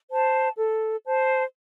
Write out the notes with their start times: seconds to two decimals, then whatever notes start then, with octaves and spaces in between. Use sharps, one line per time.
0.11 C5 A5
0.58 A4
1.06 C5 A5